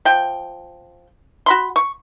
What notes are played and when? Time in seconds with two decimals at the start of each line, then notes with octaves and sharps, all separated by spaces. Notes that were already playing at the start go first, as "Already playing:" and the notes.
0.05 F3 G5
1.46 F#4 B5 C6
1.76 C#6